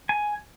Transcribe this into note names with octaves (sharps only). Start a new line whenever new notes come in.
G#5